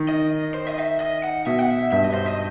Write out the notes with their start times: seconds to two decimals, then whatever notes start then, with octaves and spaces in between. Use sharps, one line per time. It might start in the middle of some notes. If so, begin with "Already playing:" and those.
Already playing: D#3
0.09 D#5
0.54 C5
0.67 D#5
0.78 E5
1.00 D#5
1.24 F#5
1.46 B2 E5
1.59 F#5
1.70 E5
1.92 G2 E5
2.04 D#5
2.14 C5
2.26 D#5